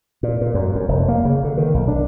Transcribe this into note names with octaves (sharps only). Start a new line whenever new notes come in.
A#2
A#2
F#2
F#2
F1
A#3
C#3
D3
D#3
B1
D4